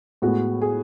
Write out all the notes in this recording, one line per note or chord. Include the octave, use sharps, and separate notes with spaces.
A2 G#3 B3 F#4
G#4